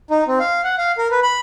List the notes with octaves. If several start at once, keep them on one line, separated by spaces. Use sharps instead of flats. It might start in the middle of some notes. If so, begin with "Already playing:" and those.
D#4
C4
F5
F#5
F5
A#4
B4
B5